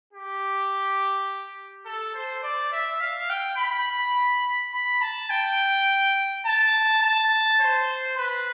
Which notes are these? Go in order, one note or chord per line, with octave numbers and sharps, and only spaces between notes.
G4
A4
C5
D5
E5
F5
G5
B5
B5
A5
G5
A5
A5
C5
B4